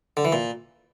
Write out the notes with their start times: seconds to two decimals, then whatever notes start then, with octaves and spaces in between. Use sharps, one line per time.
0.17 D3
0.25 E3
0.32 A#2